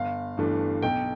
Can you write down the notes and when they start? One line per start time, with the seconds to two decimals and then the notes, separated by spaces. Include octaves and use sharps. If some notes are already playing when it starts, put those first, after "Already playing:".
Already playing: G1 F5
0.37 G2 E3 A3 D4
0.83 B1 G5